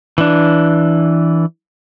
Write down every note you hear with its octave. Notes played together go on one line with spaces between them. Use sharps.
E3 D4